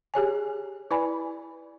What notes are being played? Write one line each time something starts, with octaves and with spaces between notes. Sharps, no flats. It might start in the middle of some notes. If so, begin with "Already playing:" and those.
G4 G#4 C#5 G#5
E4 B4 D5 G#5 B5